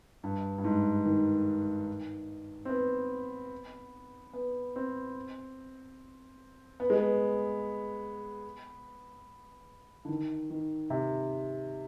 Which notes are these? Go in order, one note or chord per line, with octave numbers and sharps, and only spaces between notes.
G2
G2
G#2
D#3
C4
B3
B3
C4
B3
G#3
B3
D3
D#3
D#3
C3